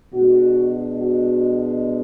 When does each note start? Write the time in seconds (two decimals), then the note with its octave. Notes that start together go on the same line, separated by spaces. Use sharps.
0.13 B2 G#3 D4 F#4
0.97 F#4